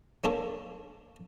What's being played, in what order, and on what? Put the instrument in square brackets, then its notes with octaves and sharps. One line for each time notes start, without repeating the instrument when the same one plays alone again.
[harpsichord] F#3 A#3 C#4 D4 A4 C#5